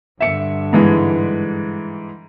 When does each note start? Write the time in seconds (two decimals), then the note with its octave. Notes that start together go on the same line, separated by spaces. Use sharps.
0.20 G2 D3 E5 C#7
0.73 G#2 E3 G#3